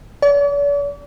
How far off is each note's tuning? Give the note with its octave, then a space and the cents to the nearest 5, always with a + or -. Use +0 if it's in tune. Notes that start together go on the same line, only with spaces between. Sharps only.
D5 -45